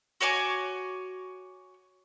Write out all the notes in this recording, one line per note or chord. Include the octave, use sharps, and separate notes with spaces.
F#4 C#5 G#5 D6